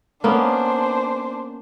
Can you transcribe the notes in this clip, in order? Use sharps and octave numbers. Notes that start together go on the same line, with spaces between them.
A#3 B3 C#4 D4 C5